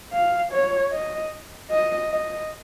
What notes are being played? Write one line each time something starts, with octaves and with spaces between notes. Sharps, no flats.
F5
C#5
D#5
D#5
D#5